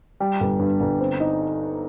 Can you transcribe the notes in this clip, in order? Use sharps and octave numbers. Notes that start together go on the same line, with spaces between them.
G3
G1
G2
G1
C4
D#4